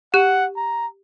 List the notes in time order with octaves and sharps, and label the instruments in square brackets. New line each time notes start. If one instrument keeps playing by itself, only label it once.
[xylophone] G4 F#6 [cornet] F#5
[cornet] A#5